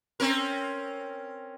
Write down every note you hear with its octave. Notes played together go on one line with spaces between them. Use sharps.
C4 C#4 A#4